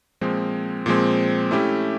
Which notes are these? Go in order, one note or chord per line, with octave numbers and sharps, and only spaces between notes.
A#2 F3 G#3 C4
A#2 F3 G#3 C4
A3 C#4 E4 G4